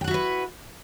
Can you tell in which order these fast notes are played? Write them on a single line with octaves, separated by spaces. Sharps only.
G5 F#5 F#4 E4 B4